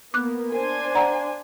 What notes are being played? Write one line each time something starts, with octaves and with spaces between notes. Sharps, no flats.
A#3 B3 D6 F#6
D4 A#4 C5 G#5
D5 F#5 A#5